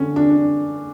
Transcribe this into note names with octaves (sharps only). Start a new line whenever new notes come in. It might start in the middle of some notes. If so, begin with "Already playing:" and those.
Already playing: D3 C#4
D4
D4